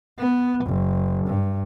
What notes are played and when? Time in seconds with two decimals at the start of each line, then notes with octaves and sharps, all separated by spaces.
0.19 B3
0.66 F#1
1.28 G2